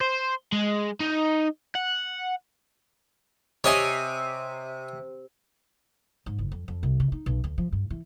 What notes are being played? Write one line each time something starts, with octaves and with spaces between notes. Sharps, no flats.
C5
G#3
D#4
F#5
C3 C#5 D#5 G#5
G#2
F#1
F2
F2
C2
C#3
D#4
B1
D2
F3
G2
E3